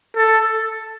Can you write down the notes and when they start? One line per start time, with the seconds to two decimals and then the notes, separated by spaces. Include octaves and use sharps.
0.16 A4